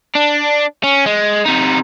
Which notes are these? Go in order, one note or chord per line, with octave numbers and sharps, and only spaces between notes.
D4
C#4
G#3
C3 D#4